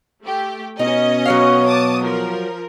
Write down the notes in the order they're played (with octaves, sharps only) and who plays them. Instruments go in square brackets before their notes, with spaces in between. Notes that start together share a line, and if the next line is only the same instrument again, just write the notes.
[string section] A3 G4
[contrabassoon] B2 [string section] C#4 D#5 [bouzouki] D#4
[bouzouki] F#3 C#5 F5
[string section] A5 D6 D#6
F3 A#4